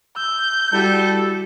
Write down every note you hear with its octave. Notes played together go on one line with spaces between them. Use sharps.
E6 G6
G3 E4 F#4 G4 A4